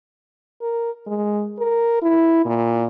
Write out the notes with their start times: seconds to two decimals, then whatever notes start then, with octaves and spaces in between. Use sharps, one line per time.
0.62 A#4
1.07 G#3
1.59 A#4
2.02 E4
2.46 A#2